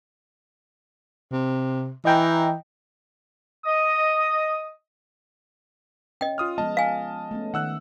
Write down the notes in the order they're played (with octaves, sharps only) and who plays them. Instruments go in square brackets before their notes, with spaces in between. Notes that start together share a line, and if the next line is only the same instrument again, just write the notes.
[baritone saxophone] C3
[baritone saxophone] E3 [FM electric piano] D#5 G5 A#5
[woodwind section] D#5 D#6
[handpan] C#4 [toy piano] D#5 G5
[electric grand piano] F4 D#6 F6
[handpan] F3 G#3 B3 [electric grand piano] D#5 A5
[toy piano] F5 G#5
[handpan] A3 B3 C#4
[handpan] D#3 [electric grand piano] F#5 E6 F#6